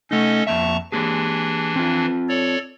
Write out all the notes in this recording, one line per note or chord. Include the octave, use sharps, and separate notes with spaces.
A3 C#4 D#4 A4 D#5
F2 A#3 E5 A5 A#5 C#6
E3 A#3 D4 G4 G#4
C4 F4
A4 C#5 D5